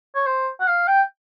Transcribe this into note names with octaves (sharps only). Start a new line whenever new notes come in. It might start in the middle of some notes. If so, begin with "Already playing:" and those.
C#5
C5
F#5
F5
G5